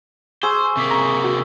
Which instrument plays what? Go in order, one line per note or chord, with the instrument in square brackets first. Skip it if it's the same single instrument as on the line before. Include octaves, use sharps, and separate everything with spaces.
[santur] G#4 [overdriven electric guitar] C5 [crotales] C#6 E6
[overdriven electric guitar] C3 A#3 [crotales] C#6 D#6 B6
[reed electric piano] A#5 C#6 [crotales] G7
[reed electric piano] F#4